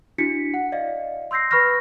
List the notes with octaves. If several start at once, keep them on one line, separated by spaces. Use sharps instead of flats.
D4 E4 F#4 B6 C#7
F#5
D5 D#5 F5
C6 E6 G6 A#6 C7
B4 B5 C#6 F6 A#6